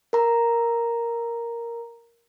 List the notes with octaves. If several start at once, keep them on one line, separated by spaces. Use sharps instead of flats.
A#4 A#5